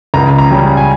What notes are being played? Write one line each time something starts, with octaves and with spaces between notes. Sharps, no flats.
C#2 A#5
A#5
C#3 G3 C#4
G#5